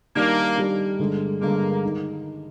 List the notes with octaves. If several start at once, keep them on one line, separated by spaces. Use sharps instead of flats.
D#3 G3 A#3 D4
D#3 G3 D4
G2 D3 G#3
G2 D3 G#3 A#3
D#3